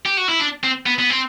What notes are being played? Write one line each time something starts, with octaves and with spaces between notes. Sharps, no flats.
G4
F#4
E4
D4
C4
B3
B3
C4